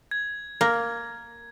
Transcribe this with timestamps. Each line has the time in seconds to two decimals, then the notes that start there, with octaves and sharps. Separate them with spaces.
0.11 G#6
0.61 A#3